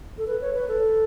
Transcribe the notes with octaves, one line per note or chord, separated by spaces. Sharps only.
A4
B4
C#5
B4
A4